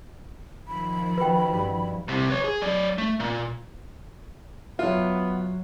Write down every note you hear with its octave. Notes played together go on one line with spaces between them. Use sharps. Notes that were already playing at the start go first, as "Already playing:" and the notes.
D#3 F3 B5
F#4 B4 G5
G2
C2 C3
B4 C#5
G#4
F#3 D5
A3
A#2
F#1 F#3 B3 F4 E5